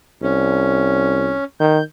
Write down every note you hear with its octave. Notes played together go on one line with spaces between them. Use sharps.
C2 C#4
D#3 G6